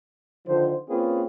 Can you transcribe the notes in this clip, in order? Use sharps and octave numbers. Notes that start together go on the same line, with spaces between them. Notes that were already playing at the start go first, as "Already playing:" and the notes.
D3 D#3 F3 C5
A#3 C4 C#4 F4 G#4 B4